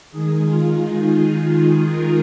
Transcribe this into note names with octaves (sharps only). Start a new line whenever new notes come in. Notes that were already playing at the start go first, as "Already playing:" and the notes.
D#3 G#3 D#4 G#4
F4
D#4 G#4
F4 A#4